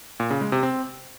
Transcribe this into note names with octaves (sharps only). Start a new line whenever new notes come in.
A#2
C#3
G#3
C3
C4